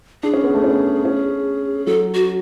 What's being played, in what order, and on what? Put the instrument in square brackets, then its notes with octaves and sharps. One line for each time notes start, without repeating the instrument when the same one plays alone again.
[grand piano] D4 [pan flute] G#4
[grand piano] C#4
B3
A3
C#4
C#4
[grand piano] F#3 [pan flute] A4
[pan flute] F#4